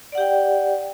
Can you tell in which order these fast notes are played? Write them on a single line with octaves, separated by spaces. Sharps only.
D5 F#5 G4 G5